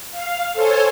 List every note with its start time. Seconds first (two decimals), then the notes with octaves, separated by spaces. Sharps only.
0.11 F5
0.53 A4 C5 C#5 G#5